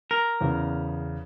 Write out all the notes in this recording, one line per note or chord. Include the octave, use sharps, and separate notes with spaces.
A#4
E2 C#3